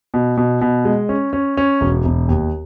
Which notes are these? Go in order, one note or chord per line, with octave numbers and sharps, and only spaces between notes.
B2
B2
B2
G#3
C#4
C#4
C#4
E1
E1
D#2